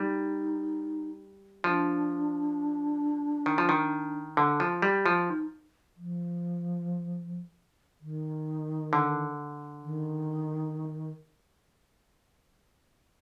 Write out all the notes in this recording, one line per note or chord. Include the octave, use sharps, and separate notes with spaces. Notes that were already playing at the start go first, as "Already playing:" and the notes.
Already playing: G3 D#4
F3 D4
D#3
F3
D#3
D3
F3
G3
F3
D#4
F3
D#3
D3
D#3